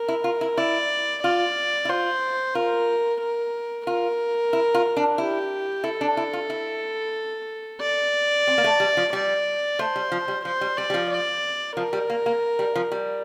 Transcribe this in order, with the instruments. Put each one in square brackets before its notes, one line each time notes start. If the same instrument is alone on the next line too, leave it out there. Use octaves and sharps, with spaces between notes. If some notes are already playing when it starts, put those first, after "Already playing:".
Already playing: [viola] A#4
[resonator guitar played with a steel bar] E4
F4
E4
[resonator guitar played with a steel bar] E4 [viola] D5
[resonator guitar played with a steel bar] F4 [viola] D5
[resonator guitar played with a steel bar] E4
[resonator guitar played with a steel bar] F4 [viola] C5
[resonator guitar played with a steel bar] F4 [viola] A#4
[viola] A#4
[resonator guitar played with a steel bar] F4 [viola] A#4
[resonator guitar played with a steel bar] E4
F4
D4
[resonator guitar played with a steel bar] E4 [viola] G4
[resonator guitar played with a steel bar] E4 [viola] A4
[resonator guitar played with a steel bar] D4
E4
F4
E4
[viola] D5
[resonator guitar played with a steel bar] C4
A#3
A3
G3
F3
[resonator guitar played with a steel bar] G3 [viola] D5
[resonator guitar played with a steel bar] A3 [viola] C5
[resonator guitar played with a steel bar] G3
F3
G3
[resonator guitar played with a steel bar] F3 [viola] C5
[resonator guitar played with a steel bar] G3
[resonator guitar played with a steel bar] G3 [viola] D5
[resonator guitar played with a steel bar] G3
F3
[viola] D5
[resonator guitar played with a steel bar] F3 [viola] A#4
[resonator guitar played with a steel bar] G3
A#3
A#3
G3
F3
G3